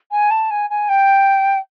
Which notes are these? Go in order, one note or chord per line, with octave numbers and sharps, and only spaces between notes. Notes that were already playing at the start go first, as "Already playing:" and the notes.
G#5
A5
G#5
G#5
G5